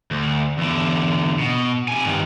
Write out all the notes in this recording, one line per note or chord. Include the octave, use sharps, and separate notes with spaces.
D2
E2 D3
B2
C3 G#5
G2 D#3